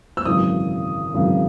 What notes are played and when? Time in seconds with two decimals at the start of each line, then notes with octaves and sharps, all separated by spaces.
0.17 E6
0.25 G#1 F#2 C#3 E3 D#6
1.14 G#1 F#2 C#3 E3